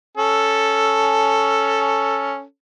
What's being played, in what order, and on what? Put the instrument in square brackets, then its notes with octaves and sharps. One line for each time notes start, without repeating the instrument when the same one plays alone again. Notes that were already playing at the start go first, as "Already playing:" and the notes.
[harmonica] C#4 A4